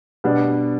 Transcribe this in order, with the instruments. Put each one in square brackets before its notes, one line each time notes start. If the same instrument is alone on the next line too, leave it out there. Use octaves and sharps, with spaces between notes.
[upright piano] B2 G3 B3 D4